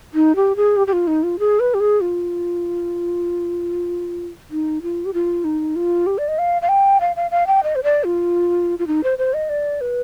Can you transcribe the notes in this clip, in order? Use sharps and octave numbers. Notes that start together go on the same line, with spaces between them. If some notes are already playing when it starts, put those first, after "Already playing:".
D#4
G4
G#4
G4
G4
F4
D#4
F4
G#4
B4
G4
G#4
F4
D#4
F4
G4
F4
D#4
F4
G4
D5
D#5
F5
F5
G5
F5
F5
F5
G5
D#5
C5
D5
F4
F4
D#4
C5
C5
D#5
D5
B4